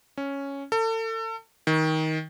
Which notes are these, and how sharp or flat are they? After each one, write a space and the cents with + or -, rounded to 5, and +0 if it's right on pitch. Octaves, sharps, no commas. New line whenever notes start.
C#4 +0
A4 +35
D#3 +20